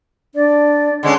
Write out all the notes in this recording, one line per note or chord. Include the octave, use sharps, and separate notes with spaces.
D4 D5
D3 G#3 C#4 C6